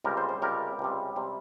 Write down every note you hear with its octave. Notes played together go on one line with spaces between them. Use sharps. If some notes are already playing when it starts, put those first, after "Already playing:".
C#2 C3 G3 A#4
C5
C5
C#2 C3 G3 A#4
C#2 C3 G3
C3 G3